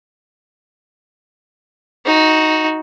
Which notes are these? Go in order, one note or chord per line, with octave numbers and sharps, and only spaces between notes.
D#4 F#4